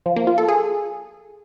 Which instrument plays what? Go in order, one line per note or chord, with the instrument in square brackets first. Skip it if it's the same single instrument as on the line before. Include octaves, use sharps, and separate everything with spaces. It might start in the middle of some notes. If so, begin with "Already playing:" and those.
[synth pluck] F3
A#3
F4
A4
G#4